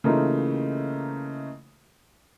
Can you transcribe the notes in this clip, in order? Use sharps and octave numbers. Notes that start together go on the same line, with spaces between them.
C#3 E3 A3 A#3 D#4 F4